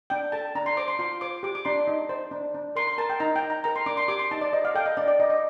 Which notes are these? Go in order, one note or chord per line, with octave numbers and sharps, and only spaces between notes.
D4 G5
A4 A5
D4 A#5
C6
C5 D6
C6
F4 C6
C5 D6
G4 D6
D6
D4 C6
D#4
C5
D4
D4
A#4 C6
C6
A#4 A5
G5
D#4 A#5
G5
D#4
A#5
A#4 A#5
C6
D4 D6
C6
G4 D6
C6
D#4 A5
D5
C5 D#5
F5
A4 G5
D#5
D4 D5
D5
D4 D#5
D#5